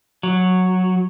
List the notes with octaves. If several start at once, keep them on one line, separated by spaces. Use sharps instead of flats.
F#3